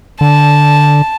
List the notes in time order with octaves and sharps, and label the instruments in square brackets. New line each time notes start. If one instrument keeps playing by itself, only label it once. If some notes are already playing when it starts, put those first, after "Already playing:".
[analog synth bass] D3 [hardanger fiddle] A5